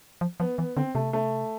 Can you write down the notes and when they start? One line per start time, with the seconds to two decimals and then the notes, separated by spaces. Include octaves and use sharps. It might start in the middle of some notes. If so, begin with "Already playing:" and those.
0.21 F3
0.40 F3 B3
0.58 E3 B3
0.77 D3 C4
0.95 C3 A3
1.13 A3